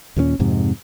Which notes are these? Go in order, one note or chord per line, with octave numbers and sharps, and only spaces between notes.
D#2 A#2 A3 C#4
F2 G#2 C3